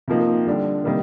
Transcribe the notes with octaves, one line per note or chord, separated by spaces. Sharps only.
C3 F3 A#3 D#4
D3 G3 D4
C3 D#3 G3 A#3